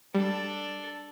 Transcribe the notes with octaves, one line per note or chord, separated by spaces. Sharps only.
G3 D4 A4